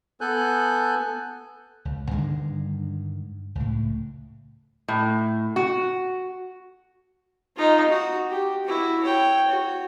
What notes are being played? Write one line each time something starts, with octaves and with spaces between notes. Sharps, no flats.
B3 A4 G#5 F#6 G6
C#2
G2 D3 D#3 G#3
C#2 A2
A2
F#4
D#4 F4
F#4
G4
E4 F#4
C#5 G5
F#4